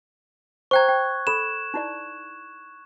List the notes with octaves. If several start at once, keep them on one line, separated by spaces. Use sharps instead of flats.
C5 G5 A#5 C#6 F#6 G#6
G5
A4 B5 E7
D#4 E4 D5